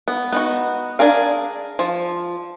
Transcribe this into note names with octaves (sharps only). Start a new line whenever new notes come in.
B3
B3 D#4 F#4
D4 G#4 A#4 F5
F3